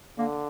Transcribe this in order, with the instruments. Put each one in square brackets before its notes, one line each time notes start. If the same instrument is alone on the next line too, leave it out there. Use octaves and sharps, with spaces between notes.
[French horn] D3 [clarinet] A#3